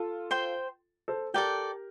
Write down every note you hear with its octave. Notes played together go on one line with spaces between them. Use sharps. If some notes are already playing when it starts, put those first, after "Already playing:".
Already playing: F4 A4
C5 G5 C6
A4 C5
G4 A4 A#4 D5 G5